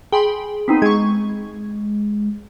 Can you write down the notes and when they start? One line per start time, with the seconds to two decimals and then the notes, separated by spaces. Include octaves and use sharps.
0.12 G#4 G5 B5 C6
0.68 B3 C4 D#4
0.82 G#3 C#6 G#6